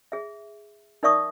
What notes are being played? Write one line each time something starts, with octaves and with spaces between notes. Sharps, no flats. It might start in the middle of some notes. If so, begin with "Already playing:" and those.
G#4 E5
D#4 A#4 D5 E5 C#6 D#6